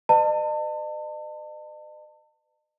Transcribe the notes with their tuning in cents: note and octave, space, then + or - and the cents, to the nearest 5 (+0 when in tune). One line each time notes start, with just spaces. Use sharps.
B4 +35 D#5 -45 A5 +35